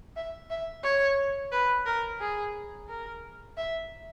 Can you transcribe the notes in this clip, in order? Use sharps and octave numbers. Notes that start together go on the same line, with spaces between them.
E5
E5
C#5
B4
A#4
G#4
A#4
E5